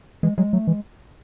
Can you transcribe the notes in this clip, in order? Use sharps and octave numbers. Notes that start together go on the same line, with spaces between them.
E3 G#3
F#3 G#3
F#3 A3
E3 G#3